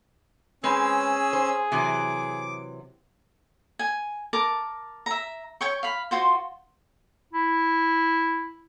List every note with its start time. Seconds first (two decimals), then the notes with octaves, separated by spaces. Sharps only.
0.64 G#3 C4 C#4 G#4 B4 E6
1.33 C5
1.72 C3 E3 F#3 D6
3.79 G#5
4.33 A#4 A5 D6
5.06 E5 A#5
5.61 C#5 G5 C#6
5.83 F5 B5
6.11 F4 F#4 C5
7.33 E4